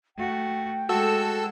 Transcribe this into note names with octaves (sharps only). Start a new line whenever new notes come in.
A3 F#4 G5
G#3 F#4 A4 E6